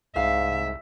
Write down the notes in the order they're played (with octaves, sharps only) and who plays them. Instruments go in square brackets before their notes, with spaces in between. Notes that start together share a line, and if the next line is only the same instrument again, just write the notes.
[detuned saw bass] C2 [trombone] G#2 [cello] E5 [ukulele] F5